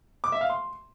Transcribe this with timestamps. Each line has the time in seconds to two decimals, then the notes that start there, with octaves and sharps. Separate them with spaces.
0.24 D6
0.32 E5
0.41 F5
0.50 C6